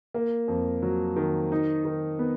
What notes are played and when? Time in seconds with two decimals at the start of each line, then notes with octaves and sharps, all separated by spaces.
0.14 A#3
0.48 F2
0.82 F#3
1.16 D#3
1.52 D#4
1.85 D#3
2.19 B3